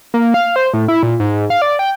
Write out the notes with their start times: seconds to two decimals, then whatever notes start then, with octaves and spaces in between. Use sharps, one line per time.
0.14 A#3
0.34 F5
0.56 C5
0.74 A2
0.88 E4
1.03 A#2
1.20 G#2
1.50 F5
1.62 D5
1.79 G5